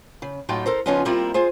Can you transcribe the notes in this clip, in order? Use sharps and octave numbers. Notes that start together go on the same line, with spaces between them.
C#3
A2 F#3 A3 D#4 F4 G5
A4 A#4 C5
C#3 F3 B3 C#4 D#4 F4
G3 A#3 C4 E4 F4 A#5
F4 G#4 C5